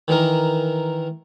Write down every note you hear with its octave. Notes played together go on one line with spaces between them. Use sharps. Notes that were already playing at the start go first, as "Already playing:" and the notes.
D#3 E3 D#4 A#4